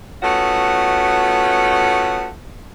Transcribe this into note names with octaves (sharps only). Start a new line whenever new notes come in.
A3 B3 C#4 F4 F#4